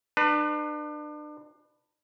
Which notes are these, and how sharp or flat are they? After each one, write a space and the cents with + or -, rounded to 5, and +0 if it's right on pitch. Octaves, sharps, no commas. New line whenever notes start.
D4 +35 B4 +5